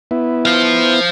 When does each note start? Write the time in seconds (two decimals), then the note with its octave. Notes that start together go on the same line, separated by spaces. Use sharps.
0.11 B3 E4
0.45 C5 F5